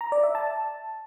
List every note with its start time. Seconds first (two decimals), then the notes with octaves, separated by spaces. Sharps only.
0.01 A#5
0.12 D5
0.23 E5
0.35 A5